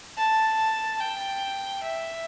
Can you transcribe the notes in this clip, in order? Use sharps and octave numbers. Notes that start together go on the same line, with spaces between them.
A5
G5
E5